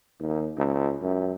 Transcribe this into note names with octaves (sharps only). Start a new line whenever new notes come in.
D#2
C#2
F#2